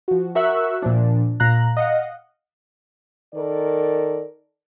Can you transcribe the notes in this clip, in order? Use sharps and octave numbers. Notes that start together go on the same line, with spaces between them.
F3 F#4
F#4 A#4 E5 C#6 E6 F#6
A#2 F3 D4
A#2 F5 A#5 F#6
D#5 F5 F#5
D#3 A4 A#4 D5